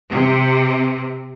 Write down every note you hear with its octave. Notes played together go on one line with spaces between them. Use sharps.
C3